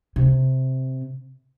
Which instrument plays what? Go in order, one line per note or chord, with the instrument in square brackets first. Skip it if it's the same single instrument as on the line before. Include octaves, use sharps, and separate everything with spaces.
[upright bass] C3